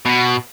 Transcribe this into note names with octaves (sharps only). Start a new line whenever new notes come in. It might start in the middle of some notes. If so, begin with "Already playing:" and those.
B2